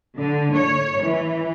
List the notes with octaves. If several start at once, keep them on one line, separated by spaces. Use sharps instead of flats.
D3
C#5
E3